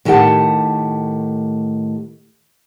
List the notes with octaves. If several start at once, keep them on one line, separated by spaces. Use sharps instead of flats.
A2 D#3 A3 G4 F#5 A5